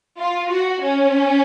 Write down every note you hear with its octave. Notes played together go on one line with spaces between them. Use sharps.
F4
F#4
C#4